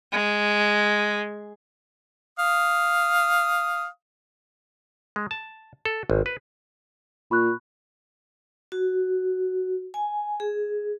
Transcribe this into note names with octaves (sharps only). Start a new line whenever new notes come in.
G#3
F5 D#6
G#3
A5
A4
G#1
B4
A#2 B5 C#6 F#6
F#4
G#5
G#4